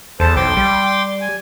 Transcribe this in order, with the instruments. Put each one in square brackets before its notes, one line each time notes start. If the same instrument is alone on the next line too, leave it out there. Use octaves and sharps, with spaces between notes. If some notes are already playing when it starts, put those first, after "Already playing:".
[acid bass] E2 [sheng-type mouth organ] A4 C5 A5
[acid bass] B1 [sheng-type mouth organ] G5 C6 D6
[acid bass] G3
[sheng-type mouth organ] G#5